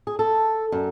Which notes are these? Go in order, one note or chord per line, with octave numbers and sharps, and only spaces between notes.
G#4
A4
F#2